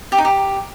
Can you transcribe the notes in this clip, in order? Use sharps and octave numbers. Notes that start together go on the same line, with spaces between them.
G4
D#4
G4